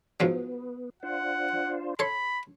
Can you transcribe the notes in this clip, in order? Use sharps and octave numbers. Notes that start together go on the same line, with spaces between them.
G#2 F3 F#3 B3
D4 F4 C5 F#5
A4 C#5 B5 C6